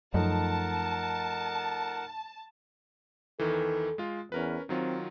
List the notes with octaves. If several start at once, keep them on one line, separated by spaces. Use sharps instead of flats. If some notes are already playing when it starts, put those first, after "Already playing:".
F#2 F3 A3 D#4 A#4 F#5 A5
E2 D#3 E3 A4
G#3 F4
E2 C#4 A#4 B4
D#3 F#3 C4 F4